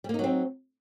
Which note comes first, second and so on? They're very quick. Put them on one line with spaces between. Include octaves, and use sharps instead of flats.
G3 A#3 D#4 F#3 C4